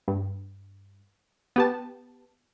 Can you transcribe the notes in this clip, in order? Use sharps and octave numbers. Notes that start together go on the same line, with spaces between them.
G2
B3 G4 A5